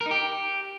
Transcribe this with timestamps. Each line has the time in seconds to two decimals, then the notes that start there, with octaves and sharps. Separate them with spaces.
0.01 A#4
0.06 D#4
0.11 G4